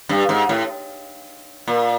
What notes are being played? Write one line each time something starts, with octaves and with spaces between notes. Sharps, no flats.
G2
G#2
A2
A#2